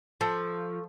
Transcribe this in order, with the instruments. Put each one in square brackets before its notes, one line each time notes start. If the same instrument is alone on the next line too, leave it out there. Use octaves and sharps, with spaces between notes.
[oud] F3 [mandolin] A3